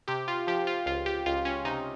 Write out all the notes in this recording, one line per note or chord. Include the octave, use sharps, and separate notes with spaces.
C3 G4
F4
F3 G4
F4
C#2 F4
G4
C#2 F4
C#4
C3 D#4